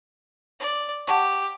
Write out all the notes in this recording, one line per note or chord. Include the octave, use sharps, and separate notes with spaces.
D5
G4 F#5 A5 C#6